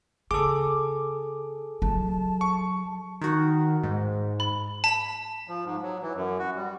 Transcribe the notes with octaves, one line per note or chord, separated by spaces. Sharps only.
C#3 G#4 A4 D6
F#3 A5
C#6
D#3 F#4
G#2
B5
A5 B5 B6
F3
G#2
F#3
E3
F#2
F#4
G3